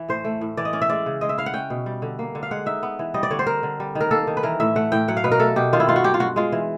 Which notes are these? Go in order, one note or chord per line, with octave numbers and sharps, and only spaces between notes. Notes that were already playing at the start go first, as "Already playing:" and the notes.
Already playing: E3
A2 C5
A3
A2
E3 D5
D#5
C#4 D5
E5
G#3 D5
C#3
G#3 D#5
E5
E4 F5
F#5
C#4 G5
B2
G3
D3
A#3
D3
F5
G#3 F#5
D#4 E5
B3
E3
G3 D#5
D5
D3 C#5
C5
C4 A#4
D3
G3
D#3
A#4
A#3 A4
D#3
B4
E3 A#4
A2 E5
A3 F#5
A2 G5
F#3 F#5
F5
B2 B4
A#4
A3 A4
B2 G4
D#3 F4
E4
G2 F4
F#4
F#3 G4
F4
G2 F#4
G#3 F4
E3